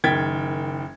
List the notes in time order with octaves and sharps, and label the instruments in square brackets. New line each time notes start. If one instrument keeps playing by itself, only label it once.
[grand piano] F#1 D#3 G5 G#6 A6 B6